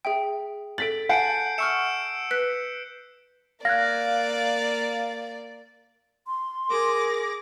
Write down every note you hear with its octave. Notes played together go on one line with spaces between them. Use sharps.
G#4 E5 G5
A4 A6 B6 D7 F#7
F#5 G#5 A5 G6 C7 D7
E5 C#6 E6 F6 C#7 E7
B4 F#6 B6
A#3 D5 F5 F#6 G#6 A#6
C6
G#4 A#4 D6 A#6